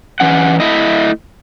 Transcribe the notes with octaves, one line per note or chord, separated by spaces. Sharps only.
E3 C#4 F#5
A3 E4 D#5